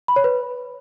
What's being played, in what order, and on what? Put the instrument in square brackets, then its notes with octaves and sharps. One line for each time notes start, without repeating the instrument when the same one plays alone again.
[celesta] B5
C#5
B4